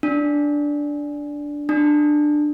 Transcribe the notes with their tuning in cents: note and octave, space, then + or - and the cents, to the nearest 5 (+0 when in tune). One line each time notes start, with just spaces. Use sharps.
D4 -5
D4 +20